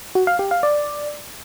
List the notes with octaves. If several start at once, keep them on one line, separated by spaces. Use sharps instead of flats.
F#4
F5
G4
F5
D5